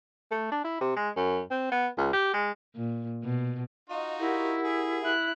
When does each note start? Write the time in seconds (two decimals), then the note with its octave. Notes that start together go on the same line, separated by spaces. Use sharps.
0.31 A3
0.52 D4
0.64 E4
0.81 C3
0.96 G#3
1.16 F#2
1.51 C4
1.71 B3
1.98 C#2
2.13 G4
2.33 G#3
2.75 A#2
3.23 B2
3.89 D#4 F4 F#4 D#5 F5
4.20 E4 G4 A#4 F#5
4.64 G#4
5.03 E4 F#6